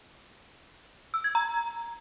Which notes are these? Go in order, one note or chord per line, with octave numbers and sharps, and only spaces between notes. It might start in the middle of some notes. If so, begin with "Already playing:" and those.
E6
G#6
A#5